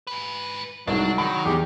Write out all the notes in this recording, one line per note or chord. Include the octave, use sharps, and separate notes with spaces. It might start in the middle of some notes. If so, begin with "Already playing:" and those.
G#2 B4
C2 G#2 F#3 D4
D#3 B5
E2 G4